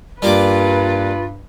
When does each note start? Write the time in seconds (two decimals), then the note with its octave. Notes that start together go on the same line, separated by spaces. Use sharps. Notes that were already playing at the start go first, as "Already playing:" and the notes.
0.22 G2 G3 A#3 F4 B4 D6